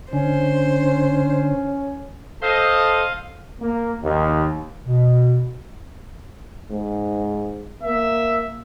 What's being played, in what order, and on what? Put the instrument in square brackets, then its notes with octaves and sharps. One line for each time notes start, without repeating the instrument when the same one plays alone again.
[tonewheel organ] D3 [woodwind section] C#4 [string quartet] C5
[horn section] A4 C5 D#5 [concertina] F5
[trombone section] A#3
D#2
[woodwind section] B2
[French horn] G#2
[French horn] A#3 [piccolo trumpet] E5